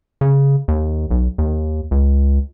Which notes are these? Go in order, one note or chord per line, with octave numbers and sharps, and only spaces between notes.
C#3
D#2
B1
D#2
C#2